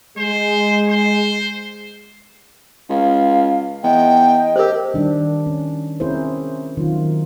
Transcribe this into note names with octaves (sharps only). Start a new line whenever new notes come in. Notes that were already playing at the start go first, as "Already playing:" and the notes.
G#3 C5
C5
C#2 F5
E2 D#5 G5
D#5
G4 A#4 C5
D#3 G3 D4
C#4
C4 C#4 E4 G#4 A#4 C5
D#3 F#3 F4